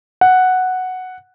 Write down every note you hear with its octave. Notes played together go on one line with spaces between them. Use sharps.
F#5